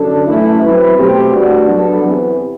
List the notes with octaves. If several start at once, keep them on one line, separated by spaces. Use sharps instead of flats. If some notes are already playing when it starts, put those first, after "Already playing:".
Already playing: F#2 D3 D4 A4
F#2 E3 A3 E4
F#3 C4 E4 B4
B2 A3 C4 G4
A2 G3 B3 D4 F#4
F#3 B3 D4 A4
E2 C3 E3 B3